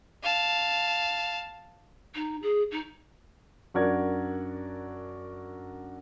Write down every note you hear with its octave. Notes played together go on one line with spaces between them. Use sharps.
F5 A5
D#4
G#4
D#4
F#2 D4 F#4 A#4 D5 G#6